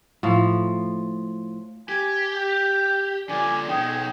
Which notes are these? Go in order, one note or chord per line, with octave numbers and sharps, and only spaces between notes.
A2 F3
G4 G#5
G5
D3 F4 D5 G#5
B2 D#4 G#4 G5